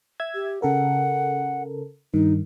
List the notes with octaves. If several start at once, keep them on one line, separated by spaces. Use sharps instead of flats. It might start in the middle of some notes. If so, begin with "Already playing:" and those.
E5 E6 G#6
G4
C#3 A4 A#4 F#5
G2 D#3 D#4